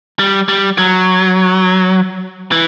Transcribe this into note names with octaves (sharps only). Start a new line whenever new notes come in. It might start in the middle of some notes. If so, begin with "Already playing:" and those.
G3
G3
F#3
E3